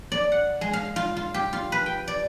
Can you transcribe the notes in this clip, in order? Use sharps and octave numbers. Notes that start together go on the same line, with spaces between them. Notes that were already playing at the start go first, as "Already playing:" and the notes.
D5
F#5
G#3
F5
F4
F4
G4
F4
B4
G5
D5